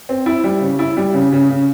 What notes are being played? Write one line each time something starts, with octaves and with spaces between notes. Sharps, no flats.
C4
E4
G3
C#3
E4
G3
C#3
C#3
C#3